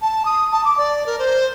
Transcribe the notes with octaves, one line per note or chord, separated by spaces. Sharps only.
A5
D#6
A5
D6
D5
A#4
C5